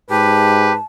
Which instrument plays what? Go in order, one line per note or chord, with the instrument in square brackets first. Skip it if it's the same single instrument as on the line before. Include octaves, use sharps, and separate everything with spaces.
[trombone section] G#2 [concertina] G4 [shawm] B4 [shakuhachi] A5